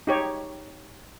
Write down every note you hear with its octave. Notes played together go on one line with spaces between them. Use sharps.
D#4 G4 C#5